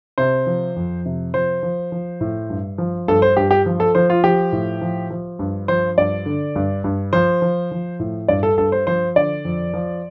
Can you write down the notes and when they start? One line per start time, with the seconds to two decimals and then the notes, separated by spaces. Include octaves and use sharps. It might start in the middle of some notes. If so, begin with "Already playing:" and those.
0.18 C3 C5
0.47 F3
0.76 F2
1.06 C3
1.34 F3 C5
1.63 F3
1.92 F3
2.21 A2
2.50 G2
2.78 F3
3.08 G2 A4
3.22 C5
3.37 G2 G4
3.51 G4
3.66 F3
3.80 A4
3.95 F3 C5
4.10 F4
4.24 F3 G4
4.53 A2
4.81 F3
5.10 F3
5.39 G2
5.68 F3 C5
5.98 G2 D5
6.26 D3
6.56 G2
6.84 G2
7.13 F3 C5
7.42 F3
7.71 F3
8.00 A2
8.28 G2 D5
8.43 A4
8.58 G2 A4
8.72 C5
8.87 F3 C5
9.16 D3 D5
9.45 F2
9.74 F3